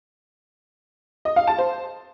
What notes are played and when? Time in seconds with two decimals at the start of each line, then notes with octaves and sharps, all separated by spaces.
1.25 D#5
1.36 F5
1.47 A5
1.59 C5